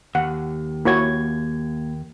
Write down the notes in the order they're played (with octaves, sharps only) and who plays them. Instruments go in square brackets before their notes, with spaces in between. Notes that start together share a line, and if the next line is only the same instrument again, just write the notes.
[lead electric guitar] D#2 [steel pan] F#5
[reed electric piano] A#3 G#6 [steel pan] E4 F#4 C#5